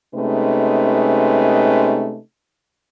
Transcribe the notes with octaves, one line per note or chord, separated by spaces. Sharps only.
C3 G#3 A3 C#4 D#4 B4